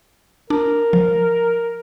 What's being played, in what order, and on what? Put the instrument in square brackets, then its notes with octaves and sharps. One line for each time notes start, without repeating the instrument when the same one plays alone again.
[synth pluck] D4 [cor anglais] A#4
[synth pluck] F3